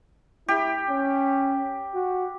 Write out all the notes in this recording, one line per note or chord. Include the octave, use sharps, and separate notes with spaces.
E4 G4
C#4
F#4